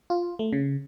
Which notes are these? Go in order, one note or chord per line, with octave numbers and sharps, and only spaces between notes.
F4
A3
C#3